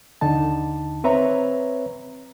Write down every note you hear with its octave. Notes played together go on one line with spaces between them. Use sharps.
D#2 D3 D#4 A5
C4 B4 C#5 E5 A#5